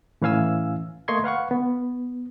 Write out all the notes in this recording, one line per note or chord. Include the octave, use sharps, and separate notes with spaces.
A2 E3 C#4 F5 G#5 E6
A3 A#3 D#5 C6 C#6 G#6
B4 F5 F#5 C#6
B3